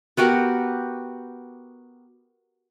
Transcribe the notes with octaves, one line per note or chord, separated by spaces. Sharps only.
B3 F#4 G4 A#4